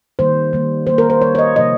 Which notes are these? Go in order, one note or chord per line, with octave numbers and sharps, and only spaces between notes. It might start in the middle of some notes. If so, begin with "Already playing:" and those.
D#3 G3 A#3 C5
D#3 G3 A#3
D#3 G3 A#3 C5
A#4
C5
D#3 G3 A#3 C#5
C#5
D#5
C3 F3 A#3 D#5